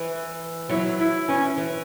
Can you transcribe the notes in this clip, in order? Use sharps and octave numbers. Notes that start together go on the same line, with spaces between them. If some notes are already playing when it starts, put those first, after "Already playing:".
Already playing: E3
F#3 E4
E4
E3 C#4
E3